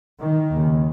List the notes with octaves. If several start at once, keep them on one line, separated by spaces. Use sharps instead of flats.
D#3
D#2 C#3